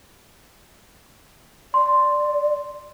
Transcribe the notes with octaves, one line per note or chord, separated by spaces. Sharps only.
D5 C6